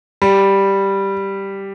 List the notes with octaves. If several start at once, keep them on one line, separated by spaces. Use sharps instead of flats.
G3